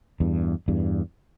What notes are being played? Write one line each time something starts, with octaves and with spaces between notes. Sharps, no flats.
E2 G2
E2 G2